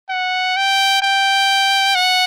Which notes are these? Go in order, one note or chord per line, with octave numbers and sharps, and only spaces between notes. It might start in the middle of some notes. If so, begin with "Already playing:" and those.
F#5
G5
G5
F#5